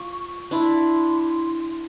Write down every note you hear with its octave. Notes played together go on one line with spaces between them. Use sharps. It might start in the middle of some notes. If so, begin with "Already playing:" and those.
Already playing: F4 C#6
D4 E4 C6